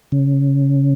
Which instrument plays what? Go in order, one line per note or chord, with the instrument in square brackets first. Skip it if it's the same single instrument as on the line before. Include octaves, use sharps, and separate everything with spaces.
[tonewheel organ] C#3